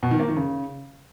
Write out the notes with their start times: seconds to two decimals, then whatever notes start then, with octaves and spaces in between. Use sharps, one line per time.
0.03 B2
0.11 D#3
0.20 A#3
0.28 D#3
0.37 C#3